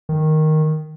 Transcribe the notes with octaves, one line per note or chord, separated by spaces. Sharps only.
D#3